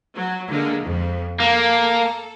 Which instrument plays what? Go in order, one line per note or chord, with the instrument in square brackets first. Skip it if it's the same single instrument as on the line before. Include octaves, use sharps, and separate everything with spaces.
[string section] F#3
D3 G#3 A#3
F2
[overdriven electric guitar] A#3 [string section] A4